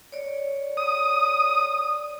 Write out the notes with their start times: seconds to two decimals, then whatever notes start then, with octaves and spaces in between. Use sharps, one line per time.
0.12 C#5 D5
0.77 D#6